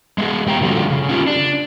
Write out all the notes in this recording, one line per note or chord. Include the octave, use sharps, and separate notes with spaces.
G#3 B3 G#4
E2 G4 G5 A#5
A#2 D3 F3 G3 A3 F#4
C#3
C#4 F4 G4
D4